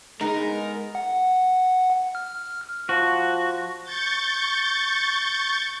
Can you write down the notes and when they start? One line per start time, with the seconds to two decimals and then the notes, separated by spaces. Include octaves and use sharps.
0.21 G#3 B3 D#4 A#4
0.95 F#5
2.15 F6
2.89 F3 F#4
3.84 C#6 G6 A6